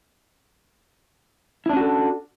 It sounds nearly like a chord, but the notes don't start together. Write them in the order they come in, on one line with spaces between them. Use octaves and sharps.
E4 D4 C#4 F#4 A4